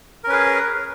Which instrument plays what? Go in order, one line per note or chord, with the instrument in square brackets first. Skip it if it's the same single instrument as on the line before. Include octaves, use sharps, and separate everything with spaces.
[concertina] A#4
C#4
B4
G#4